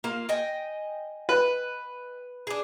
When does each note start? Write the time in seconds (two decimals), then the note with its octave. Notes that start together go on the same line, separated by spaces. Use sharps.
0.04 A#3 F4
0.29 D#5 G5 G#5
1.29 B4
2.47 D4 G#4